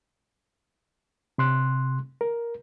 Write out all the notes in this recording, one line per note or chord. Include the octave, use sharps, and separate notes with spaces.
C3 C6 F#6
A#4